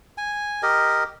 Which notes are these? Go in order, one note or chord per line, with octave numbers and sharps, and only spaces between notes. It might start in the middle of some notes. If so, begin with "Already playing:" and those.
G#5
G4 A#4 D#5